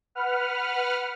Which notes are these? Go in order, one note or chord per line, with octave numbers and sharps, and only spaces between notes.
B4 F#5 F6